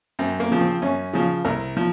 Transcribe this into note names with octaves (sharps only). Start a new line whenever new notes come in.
F#2 C4
A#3
C#3 F3
C4
F#2 C#4
C#3 F3
C2 A#4
F3